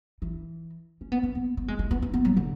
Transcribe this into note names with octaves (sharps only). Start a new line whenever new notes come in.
E3
C#4
B3
C#4
B3
B3
G#3
G#3
B3
C#4
B3
F#3
D3